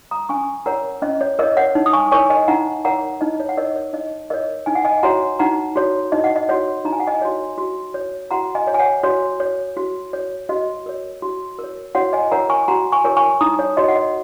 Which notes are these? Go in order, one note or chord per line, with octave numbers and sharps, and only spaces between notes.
A#5 D#6
C#4 G#5 C#6
A#4 C#5 F#5 A#5
C#4 D#5
C#5
A#4 C#5 D#5
C#5 F#5
D#4
D#6
G#5 C#6
A#4 C#5 G#5 C#6
D#5 G#5
D#4 F#5 A#5
A#4 C#5 F#5 A#5
D#4 D#5
C#5
F#5
A#4 C#5 D#5
C#5
D#4 D#5
A#4 C#5 D#5
D#4 G#5
F#5
D#5 G#5
F#4 C#5 F#5 A#5
D#4 F#5 A#5
F#4 C#5
D#4 D#5
F#5
D#5
F#4 C#5 F#5
D#4 A#5
G#5
F#5
D#5 G#5
F#4 C#5
F#4
C#5
F#4 F#5 A#5
D#5 G#5
C#5
G#5
C#5 F#5
F#4 C#5
C#5
F#4
C#5
F#4 D#5
A#4 C#5
F#4
A#4 C#5
F#4 C#5 F#5
D#5 G#5
A#4 C#5 F#5 A#5
G#5 C#6
F#4 F#5 A#5
G#5 C#6
A#4 C#5
G#5 C#6
D#4 A#5 D#6
C#5
F#4 C#5 D#5
F#5
D#5